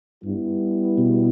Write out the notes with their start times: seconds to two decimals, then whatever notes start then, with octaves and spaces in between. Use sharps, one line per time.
0.24 G2 G3 B3 E4
0.98 B2